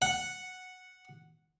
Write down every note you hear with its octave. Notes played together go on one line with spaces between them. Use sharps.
F#5